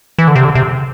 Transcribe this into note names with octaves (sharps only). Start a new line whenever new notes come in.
E3
D3
C3
D3
C3